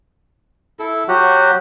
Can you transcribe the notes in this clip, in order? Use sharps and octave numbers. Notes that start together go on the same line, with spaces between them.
E4 A4
F#3 F#4 G4 F#5